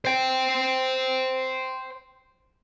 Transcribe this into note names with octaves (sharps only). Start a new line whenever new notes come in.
C5 G5